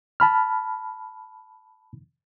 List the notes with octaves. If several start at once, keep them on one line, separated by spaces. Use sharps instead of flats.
A5 B5 F6